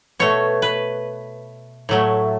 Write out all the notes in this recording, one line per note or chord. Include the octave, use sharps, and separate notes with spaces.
B2 A3 C#5
B4
A2 F#3 A3